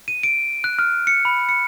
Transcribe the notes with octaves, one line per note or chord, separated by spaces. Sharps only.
D#7
D7
F#6
F6
C#7
B5
C#7